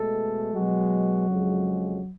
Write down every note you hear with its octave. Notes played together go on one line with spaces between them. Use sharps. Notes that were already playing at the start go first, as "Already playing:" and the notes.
Already playing: B2 G#3 A3 A4
B2 F#3 G#3 F#4
F2 C#3 G#3